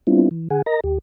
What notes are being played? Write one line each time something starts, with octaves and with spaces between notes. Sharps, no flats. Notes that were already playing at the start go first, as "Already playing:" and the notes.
G3 B3 C4 D4 E4 F4
E3
D3 G#4 F#5 G#5
A#4 D#5 A#5 A#6
D#2 G4